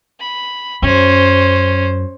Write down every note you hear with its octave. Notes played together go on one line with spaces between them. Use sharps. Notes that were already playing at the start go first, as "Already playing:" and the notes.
B5
F#2 C#4 C5